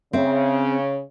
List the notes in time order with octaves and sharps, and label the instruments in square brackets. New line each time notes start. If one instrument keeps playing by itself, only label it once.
[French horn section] C#3 [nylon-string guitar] C4 E5